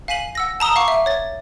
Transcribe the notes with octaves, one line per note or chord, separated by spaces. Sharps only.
F5 G#5 B6 D#7 F#7
F#5 E6 A#6
A5 A#5 D#6 E6 G7
F5 F#5 C#6 D6
E5
C#5 A6